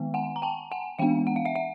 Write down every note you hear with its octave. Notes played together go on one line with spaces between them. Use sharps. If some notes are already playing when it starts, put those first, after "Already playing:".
Already playing: D#3 G#3 B3
F#5 G#5
A#5
G5 A5
F#5 G#5
E3 G#3 B3 D4 F5 G5
F#5
F5
E5 F#5
E5 F#5